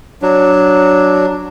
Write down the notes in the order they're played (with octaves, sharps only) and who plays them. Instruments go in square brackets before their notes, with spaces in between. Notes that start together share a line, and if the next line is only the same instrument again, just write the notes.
[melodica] F#3 D4